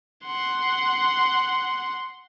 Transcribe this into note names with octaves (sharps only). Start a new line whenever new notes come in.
F#5 C6